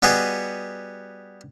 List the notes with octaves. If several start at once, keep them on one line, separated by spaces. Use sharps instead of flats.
G3 B3 F#4 G#4 D#5